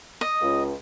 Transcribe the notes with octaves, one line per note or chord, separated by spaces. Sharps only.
D#5
C#2